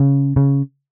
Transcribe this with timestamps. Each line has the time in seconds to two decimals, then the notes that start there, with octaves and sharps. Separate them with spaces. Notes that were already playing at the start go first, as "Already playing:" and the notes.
Already playing: C#3
0.36 C#3